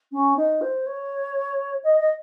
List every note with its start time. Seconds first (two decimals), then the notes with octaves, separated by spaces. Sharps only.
0.11 C#4
0.36 D#4
0.61 C5
0.86 C#5
1.83 D#5
1.99 D#5